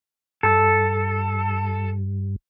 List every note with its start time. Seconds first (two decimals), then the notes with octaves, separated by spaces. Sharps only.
0.43 G2 A4